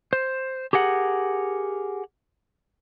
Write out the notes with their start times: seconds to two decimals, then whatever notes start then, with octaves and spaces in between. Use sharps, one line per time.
0.13 C5
0.73 G4 G#4 A#4 F#5